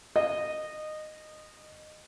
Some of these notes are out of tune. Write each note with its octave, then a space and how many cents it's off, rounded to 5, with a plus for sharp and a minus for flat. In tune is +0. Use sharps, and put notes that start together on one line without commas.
D#5 -20